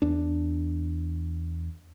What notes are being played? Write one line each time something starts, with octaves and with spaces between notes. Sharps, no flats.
E2 D4